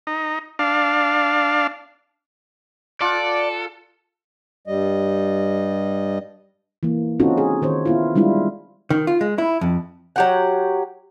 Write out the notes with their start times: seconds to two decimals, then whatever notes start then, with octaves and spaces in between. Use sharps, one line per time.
0.07 D#4
0.59 D4 F5
3.01 F4 A4 D5 F#5
4.67 G2 G3 D#5
6.83 E3 A#3
7.20 C4 C#4 D#4 F4 F#4 A4
7.37 G#4
7.62 D#3 C5 C#5
7.85 B3 E4 F4
8.15 G3 G#3 D4 E4 F4
8.90 D#3
9.07 F4
9.21 G#3
9.38 E4
9.61 F2
10.16 F#3 G4 F#5